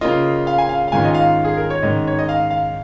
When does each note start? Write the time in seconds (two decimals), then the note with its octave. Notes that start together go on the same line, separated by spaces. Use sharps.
0.01 C#3 A#3 F4 D#5
0.47 F5
0.58 G#5
0.69 F5
0.88 F5
0.92 G#2 D#3 C#4 F4 G#5
1.05 D#5
1.14 F5
1.45 G#4
1.57 A#4
1.70 C#5
1.82 G#2 D#3 C#4 D#5
2.07 C#5
2.19 D#5
2.29 F5
2.51 F5